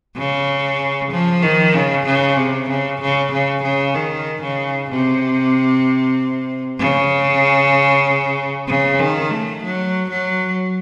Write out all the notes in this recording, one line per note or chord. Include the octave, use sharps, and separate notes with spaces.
C#3
F3
D#3
C#3
C#3
C3
C#3
C#3
C#3
C#3
D#3
C#3
C3
C#3
C#3
D#3
A3
F#3
F#3